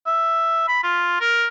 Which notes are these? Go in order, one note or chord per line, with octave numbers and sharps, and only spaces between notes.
E5
B5
F4
A#4